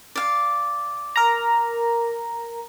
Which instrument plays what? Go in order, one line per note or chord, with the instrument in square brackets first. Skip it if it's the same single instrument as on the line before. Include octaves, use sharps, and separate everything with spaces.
[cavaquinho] D5 F5
[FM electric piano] A#4 A#5